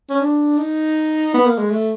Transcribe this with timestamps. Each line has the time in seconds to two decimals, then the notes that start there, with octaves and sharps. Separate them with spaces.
0.10 C#4
0.21 D4
0.58 D#4
1.34 B3
1.46 A#3
1.58 G#3
1.71 A3